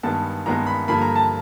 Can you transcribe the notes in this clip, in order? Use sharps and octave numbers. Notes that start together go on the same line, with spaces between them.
G2 D#3 G#3 B3 A5
G2 D#3 G#3 B3 A#5
B5
G2 D3 F3 A#3 B5
A#5
A5